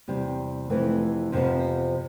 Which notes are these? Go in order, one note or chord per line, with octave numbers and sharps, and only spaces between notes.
E2 C3 G3
F2 C3 E3 A3 C4
F2 C3 F3 B3